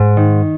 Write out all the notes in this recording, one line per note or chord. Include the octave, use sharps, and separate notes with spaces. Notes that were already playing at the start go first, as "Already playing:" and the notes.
Already playing: G#2
D#3